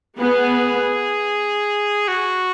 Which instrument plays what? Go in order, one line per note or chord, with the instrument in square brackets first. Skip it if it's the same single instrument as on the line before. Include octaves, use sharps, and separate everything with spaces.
[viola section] B3 [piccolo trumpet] G#4
[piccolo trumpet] F#4